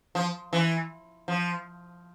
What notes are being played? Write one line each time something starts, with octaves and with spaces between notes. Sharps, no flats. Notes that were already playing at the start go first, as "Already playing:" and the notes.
F3
E3
F3